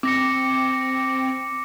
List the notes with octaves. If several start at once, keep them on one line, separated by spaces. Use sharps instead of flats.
C4 D6 A#6 C#7